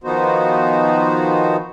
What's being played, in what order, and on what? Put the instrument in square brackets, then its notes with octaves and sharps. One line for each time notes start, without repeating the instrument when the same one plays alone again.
[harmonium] D#3 F3 B3 D#4 F#4 C5